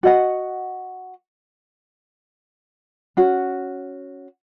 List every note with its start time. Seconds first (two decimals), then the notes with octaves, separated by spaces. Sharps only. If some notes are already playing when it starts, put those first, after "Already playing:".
0.03 F#4 D#5 F#5
3.17 C#4 F#4